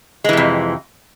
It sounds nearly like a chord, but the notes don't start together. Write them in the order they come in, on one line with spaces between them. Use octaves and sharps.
G#3 E3 C3 F2